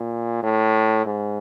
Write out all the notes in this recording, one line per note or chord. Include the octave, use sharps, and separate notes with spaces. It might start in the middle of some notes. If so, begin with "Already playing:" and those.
Already playing: A#2
A2
G#2